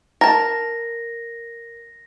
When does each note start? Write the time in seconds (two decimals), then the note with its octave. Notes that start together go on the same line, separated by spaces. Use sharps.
0.21 A#4 A5 A#6